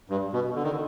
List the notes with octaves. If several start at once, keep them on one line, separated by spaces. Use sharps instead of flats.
G2
B2
D3
D#3
D3